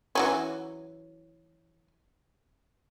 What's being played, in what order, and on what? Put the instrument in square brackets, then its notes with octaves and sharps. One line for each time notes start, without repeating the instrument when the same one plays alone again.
[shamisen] E3 F#3 C#4